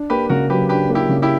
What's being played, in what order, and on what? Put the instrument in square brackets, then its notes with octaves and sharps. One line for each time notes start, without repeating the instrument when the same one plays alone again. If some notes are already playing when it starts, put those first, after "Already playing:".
Already playing: [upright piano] D4
[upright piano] A#3 [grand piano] G4 B4
[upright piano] C#3 [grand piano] F#4 A#4
[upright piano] F#3 [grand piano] G4 B4
[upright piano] D4 [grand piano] G4 B4
[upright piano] A#3
[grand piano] E4 G4
[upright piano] C#3
[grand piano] E4 G4